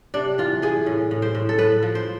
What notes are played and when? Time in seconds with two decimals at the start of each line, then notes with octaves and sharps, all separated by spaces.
0.14 C3 D4
0.38 E3 F4
0.62 E3 G#4
0.86 A2
1.11 A2
1.22 C5
1.35 A2
1.49 A4
1.58 A2 B4
1.83 F3
1.95 C5